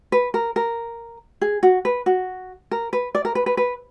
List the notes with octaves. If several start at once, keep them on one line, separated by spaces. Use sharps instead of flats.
B4
A#4
A#4
G#4
F#4
B4
F#4
A#4
B4
D5
A#4
B4
B4
B4